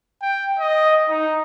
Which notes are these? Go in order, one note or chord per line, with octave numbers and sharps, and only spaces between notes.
G5
D#5
D#4